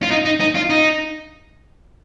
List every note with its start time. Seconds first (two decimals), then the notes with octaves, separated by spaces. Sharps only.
0.03 F4
0.11 D#4
0.25 D#4
0.40 D#4
0.55 F4
0.70 D#4